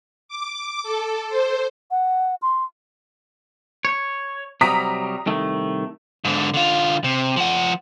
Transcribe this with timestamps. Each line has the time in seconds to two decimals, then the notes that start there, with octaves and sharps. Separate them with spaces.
0.29 D6
0.83 A4
1.29 C5
1.91 F#5
2.42 C6
3.85 C#5
4.61 C3 F#3 G3 A#5 D#6 B6
5.26 C2 D#3 A3
6.24 G#2 D3
6.54 D3 F4
7.04 C3
7.36 F3 F#5